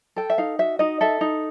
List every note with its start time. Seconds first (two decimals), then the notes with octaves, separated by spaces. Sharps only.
0.16 A4 G5
0.30 E5
0.38 D#4 F5
0.59 F#4 E5
0.79 D#4 D#5
1.01 A4 E5
1.21 D#4